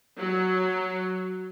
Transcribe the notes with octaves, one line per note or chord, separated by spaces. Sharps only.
F#3